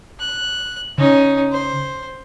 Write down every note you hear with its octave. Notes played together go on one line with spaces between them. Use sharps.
F#6
C#3 C#4 D#4
C5